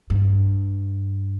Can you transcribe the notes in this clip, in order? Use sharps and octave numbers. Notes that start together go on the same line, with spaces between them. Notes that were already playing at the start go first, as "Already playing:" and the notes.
G2